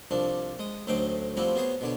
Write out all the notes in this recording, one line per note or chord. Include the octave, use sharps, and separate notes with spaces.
C2 F3 D4
G#3 D#6
D2 F#3 A3 D#4 C5 G5
F3 G3 A3 C4 E4 F#4
B3 F#4 G#4 C5 C#5
B2 D3 C#5